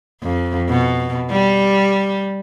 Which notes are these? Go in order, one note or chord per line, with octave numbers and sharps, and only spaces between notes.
F2
B2
G3